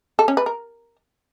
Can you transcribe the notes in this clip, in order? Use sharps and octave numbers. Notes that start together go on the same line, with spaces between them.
A4
C#4
B4
A#4